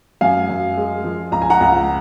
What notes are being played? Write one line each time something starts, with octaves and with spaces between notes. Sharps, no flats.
F#2 F5 G#5
F#2
G#3
F3
C#2 A#5
G#5
F#5 A#5
C#2